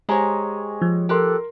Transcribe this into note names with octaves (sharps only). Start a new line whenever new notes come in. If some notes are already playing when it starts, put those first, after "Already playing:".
G#3 G4 C5 C#5 G#5 A#5
F3
G4 A4 A#4 C6 F#6